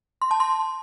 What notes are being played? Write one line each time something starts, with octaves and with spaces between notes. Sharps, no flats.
C6
A5
C6